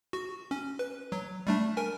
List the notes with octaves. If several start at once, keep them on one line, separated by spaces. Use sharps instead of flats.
F#4
C#4
B4
F#3
G3 A3 D4
A#4 G#5